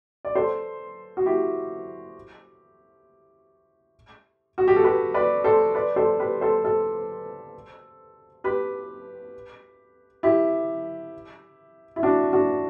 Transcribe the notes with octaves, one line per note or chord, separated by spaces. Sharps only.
D5
A4 C5
F#4
E4 G4
F#4
G4
A4
G4 B4
B4 D5
A4 C5
B4 D5
A4 C5
G4 B4
A4 C5
A4 C5
G4 B4
E4 G4
E4
D4 F#4
D4 F#4